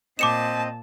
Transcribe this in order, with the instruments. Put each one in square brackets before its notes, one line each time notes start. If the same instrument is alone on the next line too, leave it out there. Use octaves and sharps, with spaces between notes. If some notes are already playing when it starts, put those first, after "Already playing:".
[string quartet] A#2 A5 [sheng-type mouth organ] C4 D#5 [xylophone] D6 C#7 E7